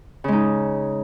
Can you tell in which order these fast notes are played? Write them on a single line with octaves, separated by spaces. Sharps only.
C#3 G#3 D#4